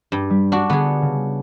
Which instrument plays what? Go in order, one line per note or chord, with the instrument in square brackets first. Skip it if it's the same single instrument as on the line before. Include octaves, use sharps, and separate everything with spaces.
[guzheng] G2
[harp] G3
[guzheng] D4 F#4
[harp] D3 G6 C#7 [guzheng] B3 G#4
[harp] C#3